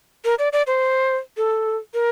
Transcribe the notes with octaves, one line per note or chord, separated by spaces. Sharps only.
A#4
D5
D5
C5
A4
A#4